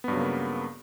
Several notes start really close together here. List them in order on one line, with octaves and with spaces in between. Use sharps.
B3 G2 F#3 C#3 A#3